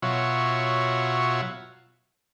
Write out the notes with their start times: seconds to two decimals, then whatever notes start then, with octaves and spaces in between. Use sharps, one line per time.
0.02 B2 F#3 F4 C#5 E5 F#5